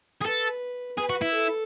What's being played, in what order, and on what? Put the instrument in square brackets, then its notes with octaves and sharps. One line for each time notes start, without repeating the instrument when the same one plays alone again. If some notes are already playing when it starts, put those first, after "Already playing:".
[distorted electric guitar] G#4
[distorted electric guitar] A4 [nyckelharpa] B4
[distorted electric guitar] G#4 [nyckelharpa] B4
[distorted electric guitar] F#4
E4
[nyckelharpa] A4